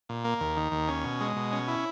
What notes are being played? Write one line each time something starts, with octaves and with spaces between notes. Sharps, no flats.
A#2
A#3
D#2
D#3
D#2
C#4
B2
G#3
B2
C#4
E4